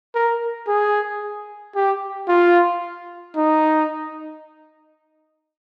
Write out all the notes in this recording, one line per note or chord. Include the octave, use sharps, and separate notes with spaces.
A#4
G#4
G4
F4
D#4